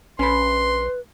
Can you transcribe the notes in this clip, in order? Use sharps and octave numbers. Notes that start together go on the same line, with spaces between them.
A#1 C#4 B4 B5 C6